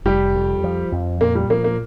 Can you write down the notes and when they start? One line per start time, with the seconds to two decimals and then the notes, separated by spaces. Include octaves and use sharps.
0.05 F1 G3 G4
0.35 F2
0.64 F3
0.92 F2
1.21 A#2 A#3
1.35 G3
1.50 F3 A#3
1.64 A#3